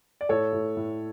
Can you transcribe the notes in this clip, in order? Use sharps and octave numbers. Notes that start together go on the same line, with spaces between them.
D5
A2 A4 C#5
A2
A2